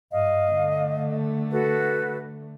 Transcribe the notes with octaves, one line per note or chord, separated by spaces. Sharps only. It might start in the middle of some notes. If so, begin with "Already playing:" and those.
G2 D#5 F5
D3 A3
F#4 A4 B4